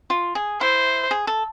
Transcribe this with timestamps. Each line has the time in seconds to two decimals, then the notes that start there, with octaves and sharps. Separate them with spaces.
0.10 F4
0.35 G#4
0.61 E4 C5
1.11 G#4
1.27 A4